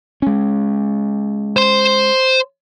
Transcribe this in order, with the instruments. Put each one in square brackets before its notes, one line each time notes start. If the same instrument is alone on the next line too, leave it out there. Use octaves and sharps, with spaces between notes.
[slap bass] G#3 C#4
[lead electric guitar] C5 C6